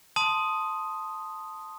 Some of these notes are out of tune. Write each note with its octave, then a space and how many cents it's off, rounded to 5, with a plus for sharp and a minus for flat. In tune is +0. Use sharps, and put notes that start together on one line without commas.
A5 +0 C6 +0 D#6 +0